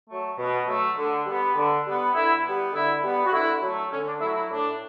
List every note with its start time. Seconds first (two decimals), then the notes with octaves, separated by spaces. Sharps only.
0.09 F#3 A3
0.38 B2
0.68 F#3 A3
0.97 D3
1.26 G3 B3
1.56 D3
1.86 G3 B3
2.15 D3 E4
2.44 G3 B3
2.73 D3 E4
3.03 G3 B3
3.26 F#4
3.33 D3 E4
3.62 F#3 A3
3.92 D3 C#4
4.06 D4
4.20 A3 E4
4.25 F#3
4.35 E4
4.50 A2 D4